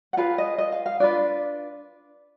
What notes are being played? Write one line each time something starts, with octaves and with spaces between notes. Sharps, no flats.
F#5
F4 G#4 B4 F5
D#5
D#5
F5
F5
D4 F4 B4 D5